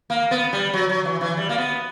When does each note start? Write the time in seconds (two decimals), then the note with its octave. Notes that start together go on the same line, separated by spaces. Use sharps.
0.10 A#3
0.31 B3
0.53 G3
0.73 F#3
0.89 F#3
1.05 E3
1.21 E3
1.37 G3
1.49 A#3
1.58 B3